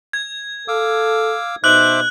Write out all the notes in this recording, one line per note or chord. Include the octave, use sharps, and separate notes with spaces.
G#6
A4 F5 D6 E6
B2 D#4 C5 E5 D6 F#6 F#7